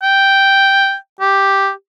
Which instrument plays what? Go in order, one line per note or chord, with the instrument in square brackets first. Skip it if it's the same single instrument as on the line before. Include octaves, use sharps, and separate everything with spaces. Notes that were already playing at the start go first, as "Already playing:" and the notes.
[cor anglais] G5
G4